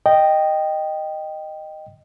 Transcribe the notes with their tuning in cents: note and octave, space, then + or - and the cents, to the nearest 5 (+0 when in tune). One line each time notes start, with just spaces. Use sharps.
D#5 -10 G5 +0